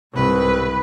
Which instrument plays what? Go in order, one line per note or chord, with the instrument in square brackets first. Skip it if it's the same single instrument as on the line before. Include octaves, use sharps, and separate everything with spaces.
[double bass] C2 [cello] G#2 B4